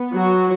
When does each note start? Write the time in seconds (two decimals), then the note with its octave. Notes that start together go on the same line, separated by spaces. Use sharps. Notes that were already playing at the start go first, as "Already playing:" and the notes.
Already playing: B3
0.14 F#3 F#4